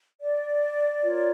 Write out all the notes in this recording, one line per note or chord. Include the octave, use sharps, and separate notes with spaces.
D5
F4 A#4 C#5